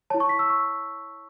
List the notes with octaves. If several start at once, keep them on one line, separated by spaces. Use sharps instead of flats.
E4 C#5 A5
C#6
B6
E6
C#6